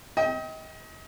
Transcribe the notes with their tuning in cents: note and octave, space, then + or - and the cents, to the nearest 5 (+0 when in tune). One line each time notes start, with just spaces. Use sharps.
D#5 +35 G5 +0